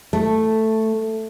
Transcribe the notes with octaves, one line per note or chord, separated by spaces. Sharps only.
A3